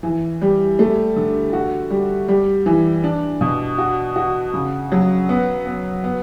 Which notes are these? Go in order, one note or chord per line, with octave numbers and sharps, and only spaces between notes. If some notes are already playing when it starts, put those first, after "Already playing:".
E3
G3
A3
D3
F#4
G3
G3
E3
D4
B2
F#4
F#4
C#3
F#3
B3
B3
B3